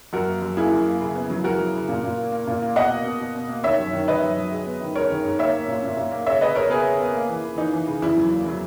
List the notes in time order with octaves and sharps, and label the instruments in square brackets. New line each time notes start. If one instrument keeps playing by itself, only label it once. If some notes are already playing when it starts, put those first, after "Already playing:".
[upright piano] F#2 F#4 A#4
A#3
F#2
A#3 E4 G#4
F#2
A#3
C#3
B3
F#3
F#3 F#4 A#4
F#3
C#3
A#2
A#2
A#3
A#3
A#2
A#3
B2 D#5 F#5
A#3
B2
B2
B2
A#3
D#3 C#5 E5
F#2
D#3
D#3 B4 D#5
F#2
F#3
G#3
B3
D#3
G#3 A#4 C#5
D#3
G#2
A#3 C#5 E5
A#3
A#2
A#2
A#2
A#3
C#3 C#5 E5
G#3 B4 D#5
C#3 A#4 C#5
B3 G#4 B4
G#3
B3
A#3
E3
E3
E3 D#4
E3
C#3
E2 E4
F#3
A#3
F#3